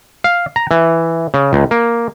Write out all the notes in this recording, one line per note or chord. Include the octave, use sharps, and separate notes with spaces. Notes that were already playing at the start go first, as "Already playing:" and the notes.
F5
A#5
E3
C#3
C#2
A#3